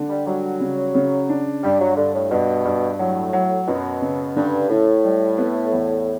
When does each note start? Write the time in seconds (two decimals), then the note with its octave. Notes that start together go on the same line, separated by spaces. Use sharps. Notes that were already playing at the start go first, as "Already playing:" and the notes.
Already playing: D3 D4
0.09 G3
0.26 F#3 G3
0.60 C#3
0.95 C#3
1.29 D4
1.63 G2 G3
1.80 F#3
1.96 G2 D3
2.14 A2
2.31 G2 B2
2.65 G2
2.99 A2 F#3
3.33 F#3
3.67 F#2 B2
4.01 C#3
4.36 G2 D3
4.69 A2 E4
5.04 G3
5.38 B3
5.72 E2